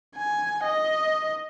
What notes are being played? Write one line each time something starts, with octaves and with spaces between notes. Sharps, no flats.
G#5
D#5